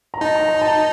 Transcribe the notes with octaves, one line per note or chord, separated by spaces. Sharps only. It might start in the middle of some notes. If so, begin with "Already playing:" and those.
A#5
D#4 A5
A#5
A#5
A5